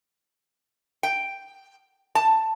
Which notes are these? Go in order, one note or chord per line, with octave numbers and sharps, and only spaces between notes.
G5
A5